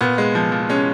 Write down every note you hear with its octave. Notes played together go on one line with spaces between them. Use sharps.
A#2 B3
G#3
F3
F3
G#3 C#4